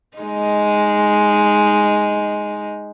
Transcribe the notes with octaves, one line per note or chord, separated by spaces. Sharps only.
G#3 D#4